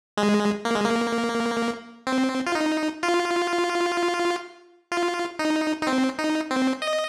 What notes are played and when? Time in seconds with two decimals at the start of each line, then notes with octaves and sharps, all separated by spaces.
0.17 G#3
0.65 A#3
0.75 G#3
0.85 A#3
2.07 C4
2.47 F4
2.55 D#4
3.03 F4
4.92 F4
5.39 D#4
5.82 D#4
5.87 C4
6.18 D#4
6.51 C4
6.82 D#5